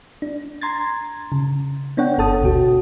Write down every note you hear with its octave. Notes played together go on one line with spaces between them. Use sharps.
D4
A#5 C6 G#6 A6
C#3
B3 D4 C#5 F#5 G5
G1 A4 A5 D#6
D2 B2 F#4